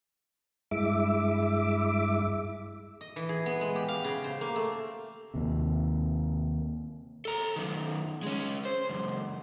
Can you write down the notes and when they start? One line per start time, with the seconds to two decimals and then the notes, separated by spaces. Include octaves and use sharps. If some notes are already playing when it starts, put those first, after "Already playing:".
0.71 G2 G#3 E4 E5 D6
3.01 D#5
3.16 E3
3.29 G#4
3.46 B3
3.61 G#3
3.76 G4
3.88 F5
4.04 C#3
4.24 C5
4.41 A#3
4.56 A3
5.34 D#2 C3
7.25 A4 A#5
7.56 F#2 D#3
8.23 G#3 C#4
8.65 C5
8.89 C#2 F#2